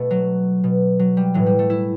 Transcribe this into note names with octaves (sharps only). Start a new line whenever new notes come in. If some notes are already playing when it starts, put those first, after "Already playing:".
Already playing: B2 A3 B3
F#3
B2
F#3
G3
A2 E3 F#3
G3
A3
E4